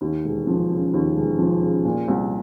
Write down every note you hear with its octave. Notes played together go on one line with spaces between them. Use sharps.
D#2
E1
F3
C#3
D#2
E1
F3
C#3
A#2
C2